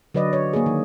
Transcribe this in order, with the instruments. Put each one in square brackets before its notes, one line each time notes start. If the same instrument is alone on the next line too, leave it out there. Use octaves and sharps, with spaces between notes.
[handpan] D3 F#3 B4 D5 D#5
C#5
A#3 G#4
D#3